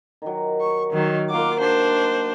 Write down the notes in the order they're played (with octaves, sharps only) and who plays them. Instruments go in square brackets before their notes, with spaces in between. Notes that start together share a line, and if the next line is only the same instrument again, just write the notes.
[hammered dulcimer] D#3 F#3
[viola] C#6
[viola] D#3 F#3 [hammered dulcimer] D#4
[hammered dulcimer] A#3 F#4 [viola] F4 D6
[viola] D4 C5